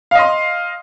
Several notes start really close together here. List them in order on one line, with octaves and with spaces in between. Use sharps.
F5 D#5 C6